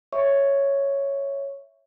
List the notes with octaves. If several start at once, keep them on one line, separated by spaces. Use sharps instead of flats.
C#5 E5 C#6